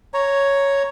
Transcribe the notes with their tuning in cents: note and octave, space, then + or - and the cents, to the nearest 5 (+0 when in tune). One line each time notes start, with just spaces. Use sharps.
C#5 +0 A#5 +0